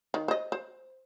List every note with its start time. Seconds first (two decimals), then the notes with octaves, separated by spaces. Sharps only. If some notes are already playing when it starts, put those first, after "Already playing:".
0.14 D#3
0.28 C5 D#5
0.52 C5